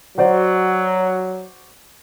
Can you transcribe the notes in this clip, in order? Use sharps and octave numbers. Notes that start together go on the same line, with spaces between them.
F#3 F#4 C5 D5